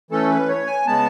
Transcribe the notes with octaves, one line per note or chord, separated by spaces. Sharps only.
E3 A3 C#4 A4
B4
C#5
G#5
C#3 G#3 B3 A5